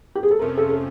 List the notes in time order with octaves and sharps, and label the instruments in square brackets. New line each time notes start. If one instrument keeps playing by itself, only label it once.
[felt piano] G4
G#4
A4
[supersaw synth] F2 C3 F3 A3 C#4 [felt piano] A#4
[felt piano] A4
A4